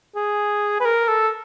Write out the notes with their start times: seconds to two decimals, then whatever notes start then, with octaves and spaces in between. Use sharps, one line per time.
0.15 G#4
0.80 B4
0.85 A#4
1.08 A4